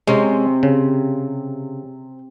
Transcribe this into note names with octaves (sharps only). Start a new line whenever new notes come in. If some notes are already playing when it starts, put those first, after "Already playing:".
C3 G#3 C#4
C#3